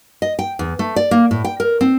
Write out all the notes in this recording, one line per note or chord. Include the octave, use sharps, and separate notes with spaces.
D#5
G5
E2
A3
D5
A#3
A2
G5
A#4
C4